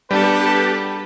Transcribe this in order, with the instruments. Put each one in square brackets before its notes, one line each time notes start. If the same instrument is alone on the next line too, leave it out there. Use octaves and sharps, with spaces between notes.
[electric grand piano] G3 [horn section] B3 B4 [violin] D4 A4 [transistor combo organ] G4